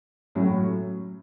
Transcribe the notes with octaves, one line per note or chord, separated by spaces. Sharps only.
A2 F#3 C#4